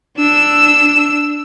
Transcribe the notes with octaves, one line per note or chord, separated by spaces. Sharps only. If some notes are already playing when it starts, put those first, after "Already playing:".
D4 E6